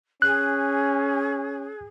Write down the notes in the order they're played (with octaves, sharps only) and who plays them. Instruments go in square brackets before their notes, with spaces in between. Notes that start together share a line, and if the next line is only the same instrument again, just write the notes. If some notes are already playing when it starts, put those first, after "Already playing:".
[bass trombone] C#4 [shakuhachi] G#4 [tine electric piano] F#6